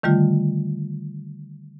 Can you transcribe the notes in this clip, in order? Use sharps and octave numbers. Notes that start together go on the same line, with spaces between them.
D3 D#3 G3 A3 F4